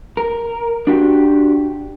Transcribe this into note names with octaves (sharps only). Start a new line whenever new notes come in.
A#4
D4 F#4 G4